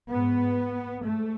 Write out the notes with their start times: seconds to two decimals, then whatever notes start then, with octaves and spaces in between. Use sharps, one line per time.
0.11 G#2 B3
1.04 G#2 A3